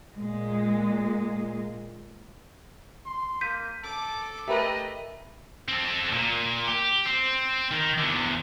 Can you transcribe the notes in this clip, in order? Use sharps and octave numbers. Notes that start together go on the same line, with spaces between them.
A#2 G#3
C6
A#3 G6 B6 D#7
A4 D6
A3 G4 A#4 B4 D#5 E5
C4 A4
A#2
G4
C4
D#3
E2 D3